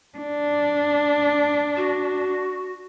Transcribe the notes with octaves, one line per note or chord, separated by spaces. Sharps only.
D4
F#4